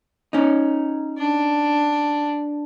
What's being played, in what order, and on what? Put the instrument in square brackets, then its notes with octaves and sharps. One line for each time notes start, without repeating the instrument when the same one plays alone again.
[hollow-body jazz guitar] C#4 D#4
[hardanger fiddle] D4